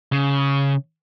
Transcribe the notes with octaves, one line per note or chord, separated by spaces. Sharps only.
C#3